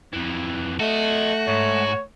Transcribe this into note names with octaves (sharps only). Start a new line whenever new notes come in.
F2 E3
A3 F#4 A4 D#5
G#2 C#5